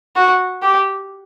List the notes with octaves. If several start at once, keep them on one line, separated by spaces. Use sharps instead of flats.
F#4
G4